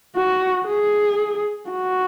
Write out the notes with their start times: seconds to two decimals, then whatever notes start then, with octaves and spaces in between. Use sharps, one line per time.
0.16 F#4
0.66 G#4
1.70 F#4